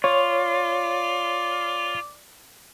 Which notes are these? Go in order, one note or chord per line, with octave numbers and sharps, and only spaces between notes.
F4 C#5 D5